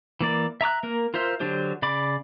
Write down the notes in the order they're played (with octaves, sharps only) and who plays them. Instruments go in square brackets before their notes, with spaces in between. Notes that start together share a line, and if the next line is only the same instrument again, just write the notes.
[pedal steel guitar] E3 A#3 D5
E5 A#5 D6 F#6
A#3 A#4
F4 A#4 C5 E5
D3 F#3 D4 G4 C5
C#3 D5 B5 D6